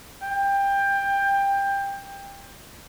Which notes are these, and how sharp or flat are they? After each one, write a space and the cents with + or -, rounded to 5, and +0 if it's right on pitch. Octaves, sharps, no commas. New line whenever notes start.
G5 +20